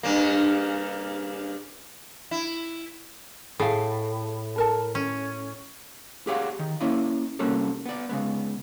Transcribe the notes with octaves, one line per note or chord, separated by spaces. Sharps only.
G2 C#3 A#3
E4
A2 G#4 F5
A4 A#4 A5
C#4
G4 G#4 C#5 D5 F5 F#5
D#3
A#3 C#4 E4 D5 D#5
C3 G3 A#3 C#4 F#4 A4
B3 D5
C#3 G#3 B3